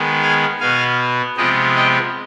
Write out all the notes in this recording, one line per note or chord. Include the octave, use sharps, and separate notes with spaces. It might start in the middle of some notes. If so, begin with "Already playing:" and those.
Already playing: D#3 G#3 B3
F5 G#5
B2 B3 F5 G#5
C3 F3 G#3 B3 D#5 G5
D#5 G5